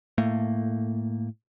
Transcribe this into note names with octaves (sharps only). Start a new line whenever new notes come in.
A2 A3 A#3